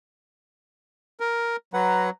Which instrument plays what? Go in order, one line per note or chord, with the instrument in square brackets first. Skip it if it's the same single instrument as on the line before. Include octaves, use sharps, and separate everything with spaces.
[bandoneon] A#4
[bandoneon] F#3 [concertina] B4 F#5 [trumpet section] A#5